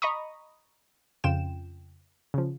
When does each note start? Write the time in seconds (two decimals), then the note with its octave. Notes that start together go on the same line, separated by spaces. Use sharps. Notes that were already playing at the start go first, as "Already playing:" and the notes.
0.02 D#5 A#5 B5 C#6 D#6
1.24 F2 C#3 F4 G5 E7
2.34 C#3 F3